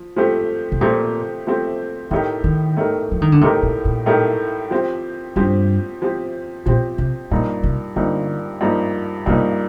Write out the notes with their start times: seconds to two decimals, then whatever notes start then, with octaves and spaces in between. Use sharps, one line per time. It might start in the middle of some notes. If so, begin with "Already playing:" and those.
Already playing: F3
0.16 F3 A3 C4 G4
0.72 C3
0.81 A#2 F3 A3 C4 G4
1.47 F3 A3 C4 G4
2.11 A2 D#3 A3 D#4 G4 A#4
2.44 D#3
2.77 A2 A3 D#4 G4 A#4
3.12 F3
3.22 D#3
3.32 D3
3.41 A2 C3 A3 D#4 G4 A#4
3.63 A#2
3.85 A#2
4.06 A2 A3 D#4 G4 A#4
4.71 F3 C4 G4
5.36 G2 F3 C4 G4
6.02 F3 C4 G4
6.66 A#2 F3 C4 G4
6.98 C3
7.31 G2 A#2 F3 A#3 D#4
7.63 C3
7.96 G2 D3 F3 A#3 D#4
8.61 G2 F3 A#3 D#4
9.26 G2 C3 F3 A#3 D#4